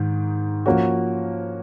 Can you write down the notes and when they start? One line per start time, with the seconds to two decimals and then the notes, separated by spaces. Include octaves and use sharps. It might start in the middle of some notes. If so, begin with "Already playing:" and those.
Already playing: G#2 D#3
0.66 F3 A#3 C#4 F#4